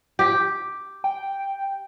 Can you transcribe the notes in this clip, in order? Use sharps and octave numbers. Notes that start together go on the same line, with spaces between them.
G4
G5